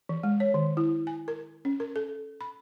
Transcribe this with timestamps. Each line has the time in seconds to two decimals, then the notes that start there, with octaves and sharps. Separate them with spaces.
0.09 E3
0.23 G#3
0.40 C#5
0.54 D#3
0.77 E4
1.07 G#5
1.28 A#4
1.65 C#4
1.80 A#4
1.96 A4
2.41 B5